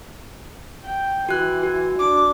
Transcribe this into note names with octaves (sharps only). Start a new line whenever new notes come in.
G5
E3 F#4 F#6
F#4
D4 D6